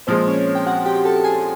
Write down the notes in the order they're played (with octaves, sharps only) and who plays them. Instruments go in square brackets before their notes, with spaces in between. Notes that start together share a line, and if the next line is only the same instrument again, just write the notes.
[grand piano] A#2 F3 G#3 [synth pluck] C4 C5
[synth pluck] C#4 C#5
G5
F#4 F#5
G4 G5
A4 A5
G#4 G#5